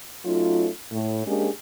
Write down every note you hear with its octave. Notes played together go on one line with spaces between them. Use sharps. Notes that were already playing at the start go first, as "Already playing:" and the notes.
F#3 A3 C#4 D#4 F4
A2
G#3 A#3 C#4 D4 G4 G#4